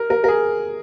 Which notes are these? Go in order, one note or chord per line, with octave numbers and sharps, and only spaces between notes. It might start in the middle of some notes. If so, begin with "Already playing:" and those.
Already playing: A#4
A#4
A#4
G#4